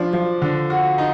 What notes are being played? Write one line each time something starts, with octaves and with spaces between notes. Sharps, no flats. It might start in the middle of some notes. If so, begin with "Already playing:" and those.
Already playing: F3 D4
F3
D3
F#4
D#4